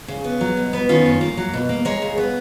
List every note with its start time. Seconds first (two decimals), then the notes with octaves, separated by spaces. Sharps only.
0.08 C#3
0.24 B3
0.41 F#3
0.57 B2
0.73 B3
0.89 D#3 C#4 F4
1.06 F#2
1.21 A#3
1.37 F#3
1.53 B2
1.69 A#3
1.85 G#3 A#4 C#5
2.02 C#3
2.18 B3